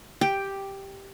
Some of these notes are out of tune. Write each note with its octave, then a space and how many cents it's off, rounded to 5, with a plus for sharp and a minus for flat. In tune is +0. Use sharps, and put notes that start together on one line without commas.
G4 +0 G5 +5